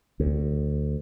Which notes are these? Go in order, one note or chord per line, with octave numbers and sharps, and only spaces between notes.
D2